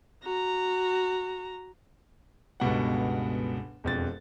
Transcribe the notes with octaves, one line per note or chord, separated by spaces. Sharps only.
F#4 A#5
G1 C#2 B2 F#5
E1 F2 A6